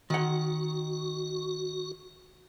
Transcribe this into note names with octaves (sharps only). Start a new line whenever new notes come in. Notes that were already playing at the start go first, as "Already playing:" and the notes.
D#3 F#4 F#5